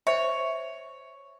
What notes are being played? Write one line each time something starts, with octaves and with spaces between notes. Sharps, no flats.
C5 C#5 E5